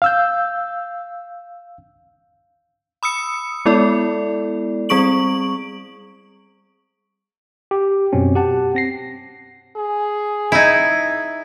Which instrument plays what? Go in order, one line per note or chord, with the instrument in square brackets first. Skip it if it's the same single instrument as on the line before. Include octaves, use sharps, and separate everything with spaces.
[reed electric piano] F5 E6 G6
[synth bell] B5 D#6 E6 C#7
G#3 B3 E4 A4 D5
G3 C4 G#4 C#6 D7 F#7
[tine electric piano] G4
F#2 B2 C4 C#4
G4 F#5 A5
C4 A#6 C7
[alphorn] G#4
[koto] D#4 E4 [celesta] B5 E6 G#6